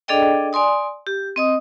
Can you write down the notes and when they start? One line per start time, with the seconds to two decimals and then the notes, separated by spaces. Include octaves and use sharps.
0.08 D4 G#4 A4 D5 D#5 G5
0.53 D5 G#5 C6 D#6
1.07 G4
1.36 C4 D#5 D#6